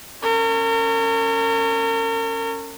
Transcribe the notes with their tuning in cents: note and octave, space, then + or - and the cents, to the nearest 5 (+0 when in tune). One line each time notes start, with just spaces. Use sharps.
C#4 +0 A#4 -40